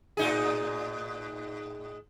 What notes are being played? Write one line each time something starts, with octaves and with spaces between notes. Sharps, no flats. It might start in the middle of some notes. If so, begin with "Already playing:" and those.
A2 D#4 G#4